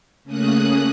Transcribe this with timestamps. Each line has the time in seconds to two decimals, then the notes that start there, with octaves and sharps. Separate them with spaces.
0.24 C#3 A3 A#3 C#4 D#6 F#6